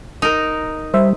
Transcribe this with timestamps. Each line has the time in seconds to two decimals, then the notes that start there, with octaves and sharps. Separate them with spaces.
0.22 D#4 A#4
0.94 G3 C5 E5